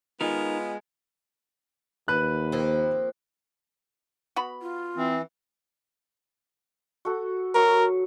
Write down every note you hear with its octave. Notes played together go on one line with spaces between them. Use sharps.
G#3 B3 D#4 F4 A#4
D#2 B4 F#6
F3 A#3 C4
B3 F#4 B5
F4
E3 C4
F#4 A4
F#3 A#4 C#6 D#6